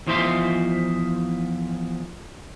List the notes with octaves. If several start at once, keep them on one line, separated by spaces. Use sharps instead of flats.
E2 F3 D#4 C5 E5 C6